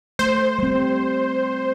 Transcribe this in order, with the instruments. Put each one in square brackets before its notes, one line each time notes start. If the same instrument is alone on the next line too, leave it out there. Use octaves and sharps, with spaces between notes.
[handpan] A3 [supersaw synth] C5
[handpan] G3 C4